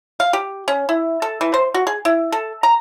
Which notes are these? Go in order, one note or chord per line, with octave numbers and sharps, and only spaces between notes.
F5
G4
C#4
E4
A4
E3
C5
F#4
G#4
E4
A4
A#5